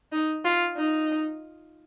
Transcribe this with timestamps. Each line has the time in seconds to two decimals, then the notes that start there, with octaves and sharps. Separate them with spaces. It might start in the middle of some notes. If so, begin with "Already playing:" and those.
0.12 D#4
0.45 F4
0.77 D#4